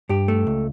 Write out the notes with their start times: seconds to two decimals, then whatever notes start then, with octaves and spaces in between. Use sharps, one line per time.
0.09 G2 G4
0.28 A3
0.47 C#2